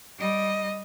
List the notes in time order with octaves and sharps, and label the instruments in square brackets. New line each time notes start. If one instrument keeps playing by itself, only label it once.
[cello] G3 D#5